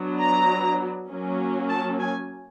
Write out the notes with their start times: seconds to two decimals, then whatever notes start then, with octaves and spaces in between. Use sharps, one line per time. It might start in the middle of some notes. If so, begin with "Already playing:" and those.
Already playing: F#3 B3 D4
0.19 A#5
1.09 F#3 A#3 C#4
1.69 A5
1.99 G#5